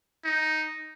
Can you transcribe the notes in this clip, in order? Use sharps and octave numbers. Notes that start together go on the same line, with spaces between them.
D#4